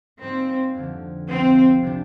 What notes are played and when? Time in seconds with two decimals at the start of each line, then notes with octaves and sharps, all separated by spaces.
0.21 G#2 G3 A#3 C4
0.75 F2 D3 F3
1.27 C2 C3 F3 C4
1.83 C3 G3 D4